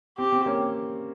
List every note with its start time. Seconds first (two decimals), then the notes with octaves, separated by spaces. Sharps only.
0.18 C4 G4
0.32 C4
0.46 A#3 C#4